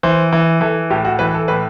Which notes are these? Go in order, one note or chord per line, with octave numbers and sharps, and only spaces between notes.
E3 C5
E3
E3 A4
A2 G4
F#4
E3 B4
A4
A2 B4